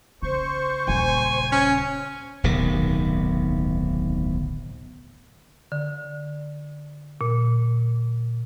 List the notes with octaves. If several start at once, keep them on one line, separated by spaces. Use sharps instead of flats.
C#3 C5 C#6
D#1 C#3 G#5
C#4
D1 B1 C3 D#3
D3
A#2